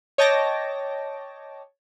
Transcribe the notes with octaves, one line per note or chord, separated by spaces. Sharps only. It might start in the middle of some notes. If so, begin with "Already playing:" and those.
C#5 D#5 G5 A5 D6 A#6